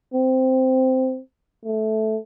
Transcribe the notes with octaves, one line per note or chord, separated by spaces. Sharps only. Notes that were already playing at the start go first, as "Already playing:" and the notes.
C4
A3